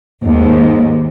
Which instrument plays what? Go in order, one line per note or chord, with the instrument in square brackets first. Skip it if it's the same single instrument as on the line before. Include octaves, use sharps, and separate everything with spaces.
[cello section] D#2 G#2